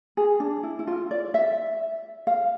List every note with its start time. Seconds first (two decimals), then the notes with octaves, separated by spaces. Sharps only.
0.17 G#4
0.40 D4
0.63 E4
0.79 E4
0.87 F4
1.11 D5
1.34 E5
2.27 F5